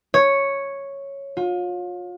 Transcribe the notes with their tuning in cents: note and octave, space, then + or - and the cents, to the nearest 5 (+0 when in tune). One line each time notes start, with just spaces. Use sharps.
C#5 -5
F4 +35